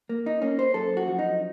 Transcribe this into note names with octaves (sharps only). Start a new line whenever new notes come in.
A#3
D#4
A#3 C#4
C5
F#2 A4
F#4
F3
D#4